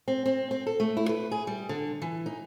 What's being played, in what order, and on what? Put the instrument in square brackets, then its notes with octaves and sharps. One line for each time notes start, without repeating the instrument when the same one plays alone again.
[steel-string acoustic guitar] C4
C4
C4
A4
A3
E4
B4
G#4
G3
D3
E3
D#4